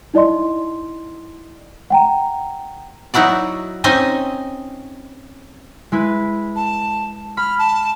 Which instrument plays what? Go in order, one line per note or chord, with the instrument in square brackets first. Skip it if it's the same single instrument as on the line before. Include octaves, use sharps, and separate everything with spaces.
[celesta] D#4 E4 D5 D#5 C6
F#5 G5 A#5
[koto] F#3 D#4 E4 F#4 D5
C4 C#4 D#4 D#5 G#5
[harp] G#3 E4 B4
[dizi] A5
[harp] B5 [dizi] F6
[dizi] A5